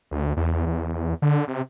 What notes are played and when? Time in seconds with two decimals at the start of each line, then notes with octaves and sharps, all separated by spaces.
0.11 D2
0.37 E2
0.50 E2
0.66 E2
1.22 D3
1.48 C3